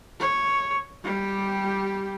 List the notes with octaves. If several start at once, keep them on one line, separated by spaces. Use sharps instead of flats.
C#5
G3 G4